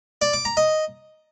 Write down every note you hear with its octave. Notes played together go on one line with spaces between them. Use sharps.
D5
D6
A#5
D#5